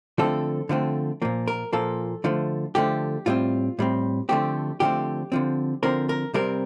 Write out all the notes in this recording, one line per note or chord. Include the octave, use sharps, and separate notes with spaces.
D3 F3 A3 C4 A4
D3 F3 A3 C4
A#2 F3 A#3
A#4
A#2 F3 A#3 A4
D3 F3 A3
D3 F3 A3 G4
A2 G3 C4 F4
A2 G3 C4
D3 F3 A3 C4 G4
D3 F3 A3 C4 G4
D3 F3 C4
D3 F3 C4 A#4
A#4
C3 G3 C4 A#4